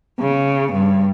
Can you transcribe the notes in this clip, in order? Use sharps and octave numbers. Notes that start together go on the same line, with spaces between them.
C#3
G2